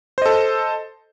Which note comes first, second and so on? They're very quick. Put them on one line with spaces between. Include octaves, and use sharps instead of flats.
C5 D#5 A4